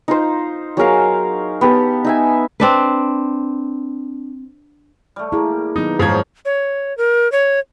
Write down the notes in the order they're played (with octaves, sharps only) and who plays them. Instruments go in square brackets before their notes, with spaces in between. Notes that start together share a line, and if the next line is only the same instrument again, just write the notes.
[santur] D#4 F4 C5
F#3 G#4 A#4 F5
B3 G4 A4 A5
D#4 E5 G#5
[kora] C4 D4 B4
[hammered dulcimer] G3 A3
[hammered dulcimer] A#3 [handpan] E4 G#4
[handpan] D#3 F#3 B3 [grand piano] D#4
[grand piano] G#2 F3 G#6 [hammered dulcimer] C#4 D#4 G#4
[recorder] C#5
A#4
C#5